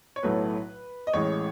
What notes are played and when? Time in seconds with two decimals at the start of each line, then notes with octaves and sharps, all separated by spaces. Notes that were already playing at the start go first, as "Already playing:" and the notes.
0.16 C#5
0.23 B1 A2 F#3 A3 B4
1.07 D#5
1.13 A1 A2 G#3 C#5